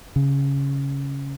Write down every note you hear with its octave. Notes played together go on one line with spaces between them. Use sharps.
C#3